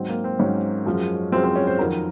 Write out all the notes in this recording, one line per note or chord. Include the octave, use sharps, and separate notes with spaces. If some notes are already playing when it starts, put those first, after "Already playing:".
Already playing: G#2 F#3 C4
A#3
C4
G#2 F#3 C#4
F#2 F3 G#3
F#2 F3 G#3 C4
C4
C#4
C5
F2 D#3 F#3 A#4